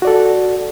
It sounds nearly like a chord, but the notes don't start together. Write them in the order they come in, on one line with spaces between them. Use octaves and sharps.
F#4 D5 A4